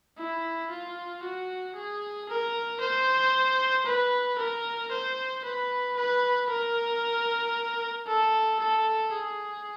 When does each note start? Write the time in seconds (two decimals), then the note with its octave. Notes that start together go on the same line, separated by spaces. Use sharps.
0.18 E4
0.70 F4
1.23 F#4
1.76 G#4
2.29 A#4
2.81 C5
3.86 B4
4.39 A#4
4.92 C5
5.45 B4
5.97 B4
6.50 A#4
8.07 A4
8.60 A4
9.13 G#4